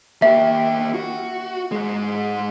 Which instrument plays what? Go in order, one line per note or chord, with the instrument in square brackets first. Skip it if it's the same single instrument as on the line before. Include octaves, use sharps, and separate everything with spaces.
[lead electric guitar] A#3 G4 [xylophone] E5
[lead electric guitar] F#4
G#2 G#3